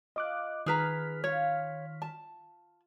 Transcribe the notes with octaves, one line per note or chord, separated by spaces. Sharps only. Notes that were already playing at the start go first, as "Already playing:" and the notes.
F4 D#5 D6 F#6
D#3 G#4 B4 A#5 F6 B6
F4 C#5 F5
A5